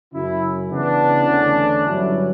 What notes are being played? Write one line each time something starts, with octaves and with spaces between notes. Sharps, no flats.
F#2 C#3 F#3 C#4 E4
C#3 E3 B3 D4
E2 D3 A3 C#4
G2 D3 F#3 C#4 E4